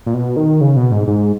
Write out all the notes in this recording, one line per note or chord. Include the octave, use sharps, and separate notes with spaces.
A#2
B2
D#3
C#3
B2
G#2
G#2